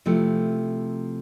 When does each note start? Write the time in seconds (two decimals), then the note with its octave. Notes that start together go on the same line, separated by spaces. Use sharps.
0.06 C3 F3 A3 E4